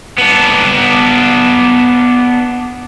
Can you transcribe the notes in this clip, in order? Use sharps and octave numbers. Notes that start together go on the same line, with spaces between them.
B3 D4